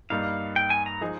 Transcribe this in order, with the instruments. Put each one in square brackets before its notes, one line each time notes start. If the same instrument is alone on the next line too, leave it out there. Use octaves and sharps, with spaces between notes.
[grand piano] G2 G3 A#3 D#4 [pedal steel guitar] F5
[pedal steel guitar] G5
G#5
A#5
[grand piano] F3 G#3 D#4 G#4 D#5